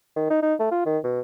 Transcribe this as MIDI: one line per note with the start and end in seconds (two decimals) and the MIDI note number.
0.16 0.28 51
0.30 0.38 63
0.42 0.54 63
0.60 0.69 57
0.71 0.82 65
0.86 0.98 51
1.04 1.20 47